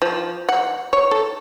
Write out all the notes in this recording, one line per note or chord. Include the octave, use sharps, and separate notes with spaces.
F3
F#5
C#5
A4